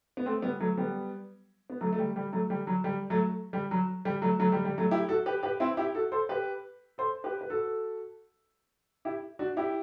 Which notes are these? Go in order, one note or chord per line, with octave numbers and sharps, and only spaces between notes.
B3
A3 C4
G3 B3
F#3 A3
G3 B3
B3
F#3 A3
A3
G3
G3
F#3 A3
G3
F#3
G3
F#3 A3
G3
F#3
G3
F#3 A3
F#3 A3
G3
G3
F#3 A3
E4 G4
F#4 A4
G4 B4
G4 B4
C4 E4
E4 G4
F#4 A4
A4 C5
G4 B4
A4 C5
G4 B4
B4
F#4 A4
E4 G4
D4 F#4
E4 G4